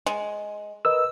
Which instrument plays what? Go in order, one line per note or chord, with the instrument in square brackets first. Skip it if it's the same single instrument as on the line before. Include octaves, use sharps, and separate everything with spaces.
[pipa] G#3
[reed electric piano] A#4 B4 D#5 [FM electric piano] E6